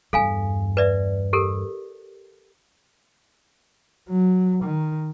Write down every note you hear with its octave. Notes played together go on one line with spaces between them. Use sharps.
E2 G2 A4 F5 G#5
B4 D5 E5
G4 A4 A#4
F#3
D#3